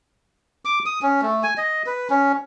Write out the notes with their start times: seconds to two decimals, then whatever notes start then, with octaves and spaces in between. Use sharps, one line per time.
0.65 D6
0.86 D#6
1.02 C#4
1.22 A3
1.43 G#5
1.58 D#5
1.86 B4
2.10 C#4